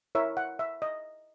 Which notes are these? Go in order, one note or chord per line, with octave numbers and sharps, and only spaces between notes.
E4 A#4 C#5 E5
F#5
E5
D#5